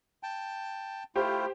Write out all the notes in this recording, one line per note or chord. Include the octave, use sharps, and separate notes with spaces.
G5 A5
A3 E4 F4 G4 C5